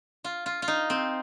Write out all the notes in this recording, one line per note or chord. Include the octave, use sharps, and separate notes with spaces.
F4
F4
F4
D#4
C4